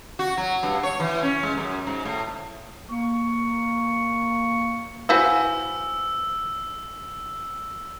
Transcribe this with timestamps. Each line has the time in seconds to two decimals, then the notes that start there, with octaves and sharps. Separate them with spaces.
0.19 F#4
0.37 F#3
0.63 G2
0.83 C#5
1.00 E3
1.23 C#4
1.43 G#3
1.57 F#2
1.87 G#2
2.05 A2
2.90 A#3 C#6
5.09 E4 F#4 B4 C5 F5 G#5 E6